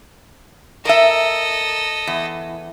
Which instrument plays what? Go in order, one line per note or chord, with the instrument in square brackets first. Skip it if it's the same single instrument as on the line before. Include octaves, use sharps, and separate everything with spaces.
[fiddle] A4 D#5 [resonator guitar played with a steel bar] A#4 E5
[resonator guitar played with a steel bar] E2